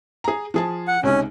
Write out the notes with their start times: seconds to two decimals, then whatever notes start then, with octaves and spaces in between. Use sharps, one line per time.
0.24 G#4 A#5
0.54 F3 G#4 A5
0.88 F#5
1.03 C#2 C3 C#4 D#4